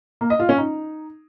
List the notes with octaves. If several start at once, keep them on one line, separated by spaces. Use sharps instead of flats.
A#3
D#5
F4
C#4
D#4